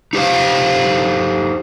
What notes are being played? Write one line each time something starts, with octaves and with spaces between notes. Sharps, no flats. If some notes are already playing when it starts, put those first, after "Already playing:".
D#4 G4 C5 F5